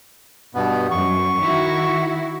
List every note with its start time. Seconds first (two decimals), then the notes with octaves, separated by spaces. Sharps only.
0.55 G2 B2 B3
0.91 F#2 C#6
1.41 D#3 E4 F#4